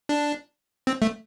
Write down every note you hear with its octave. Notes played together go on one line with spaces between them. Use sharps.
D4
C4
A3